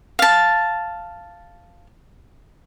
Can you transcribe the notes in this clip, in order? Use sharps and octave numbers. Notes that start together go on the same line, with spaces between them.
F5 A5